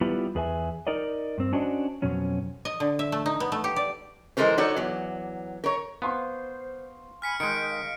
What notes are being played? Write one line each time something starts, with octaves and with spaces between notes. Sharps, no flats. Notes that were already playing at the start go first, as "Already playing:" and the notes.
G3 B3 E4 F4 G4 B4
E2 G#4 B4 E5 G#5
D#4 A#4 D5 D#5
G2 C4
C#4 D4 F#4 C5 D#5
F2 B2 F#3 C#4
D#5
D3
E5
A3
D#4
B3
A3
G4
D5
E3 G#3 G4 A4 A#4 C5
D#4 F#4 A4 C#5 D5
E2 F#3
A#4 C#5
B3 C5 F5 C6 C#6
G#5 B5 F6 B6 C#7
D#3 G#3 D#5 G6 C#7 D7
D#5 F5